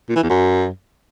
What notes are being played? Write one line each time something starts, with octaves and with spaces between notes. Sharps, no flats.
A#2
E3
E2
F#2